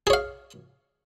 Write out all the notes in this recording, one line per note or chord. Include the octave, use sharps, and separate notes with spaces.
G#4 C#5 F5